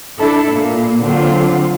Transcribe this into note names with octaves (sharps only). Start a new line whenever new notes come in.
D4 E4 A4
A#2 A#3
D3 F#3 C4 F4